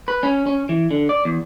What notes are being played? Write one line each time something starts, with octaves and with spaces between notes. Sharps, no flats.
B4
C#4
C#4
E3
D3
D5
E2